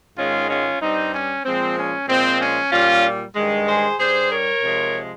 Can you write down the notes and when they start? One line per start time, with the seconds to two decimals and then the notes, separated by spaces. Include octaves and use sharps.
0.17 G#2 D#3 G#3 C#4 F4
0.50 C#4 F4
0.81 G2 G3 C4 D#4
1.13 C#4
1.45 A#2 F3 G#3 C4
1.76 C#4
2.08 A#2 F3 G#3 C4
2.40 C#4
2.72 A#2 G3 C#4 F4
3.36 G2 D#3 G#3
3.67 G#4 C5
3.99 G2 G3 G#4 C5
4.30 A#4 C#5
4.62 C3 F3 G#3